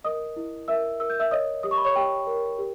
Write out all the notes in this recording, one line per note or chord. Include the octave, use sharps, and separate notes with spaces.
A#4 D#5 D#6
E4
A#4 E5 E6
A#4 E6
G6
E5 E6
C#5 D#5 D#6
G4 D#6
C#6
B5
C#5 C#6
G4 G5
A#4
G4